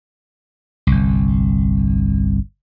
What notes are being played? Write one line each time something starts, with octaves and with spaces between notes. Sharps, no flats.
G1 C2